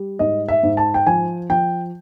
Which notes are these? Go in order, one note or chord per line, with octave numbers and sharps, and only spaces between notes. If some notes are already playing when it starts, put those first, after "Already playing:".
Already playing: G3
G#2 D#5
E5
G#2
A5
G5
F3 G#5
F3 G5